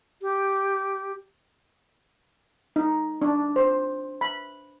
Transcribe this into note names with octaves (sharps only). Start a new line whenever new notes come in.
G4
D#4
D4
C5
B5